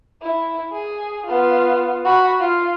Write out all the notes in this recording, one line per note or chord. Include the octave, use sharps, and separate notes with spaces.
E4
G#4
B3 F4
F#4 B5
F4